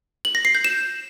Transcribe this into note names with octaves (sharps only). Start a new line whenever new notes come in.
F#7
A#6
C7
G6
E7